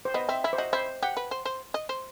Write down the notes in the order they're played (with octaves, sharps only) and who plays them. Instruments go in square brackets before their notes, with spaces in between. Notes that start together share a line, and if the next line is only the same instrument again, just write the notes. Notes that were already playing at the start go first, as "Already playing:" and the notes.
[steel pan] C5
[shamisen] B3 [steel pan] D#5
[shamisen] C4 [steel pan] E5
[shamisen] E4 [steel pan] E5
[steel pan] C5
[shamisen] F#4 [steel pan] D#5
[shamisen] E4 [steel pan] C5
[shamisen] G4 [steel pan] F#5
[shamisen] B4
C5
C5
D#5
C5